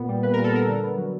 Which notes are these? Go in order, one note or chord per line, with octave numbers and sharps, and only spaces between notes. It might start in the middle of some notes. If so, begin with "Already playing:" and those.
Already playing: A#2 B3
G3
A#2 B4
A#2 A#4
A4
B3 A#4
D3
B3
F#3